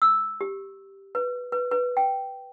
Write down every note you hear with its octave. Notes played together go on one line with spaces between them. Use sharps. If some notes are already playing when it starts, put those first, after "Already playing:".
E6
G4
B4
B4
B4
G5